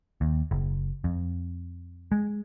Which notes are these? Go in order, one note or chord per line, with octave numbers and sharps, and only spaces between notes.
D#2
F#1
F2
G#3